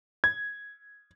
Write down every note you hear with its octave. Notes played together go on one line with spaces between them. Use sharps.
G#6